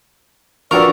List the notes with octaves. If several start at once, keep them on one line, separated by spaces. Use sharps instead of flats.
F3 D4 F#4 A#4 B4 D5 C#6 E6